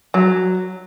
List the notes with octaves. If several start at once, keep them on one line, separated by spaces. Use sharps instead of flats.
F#3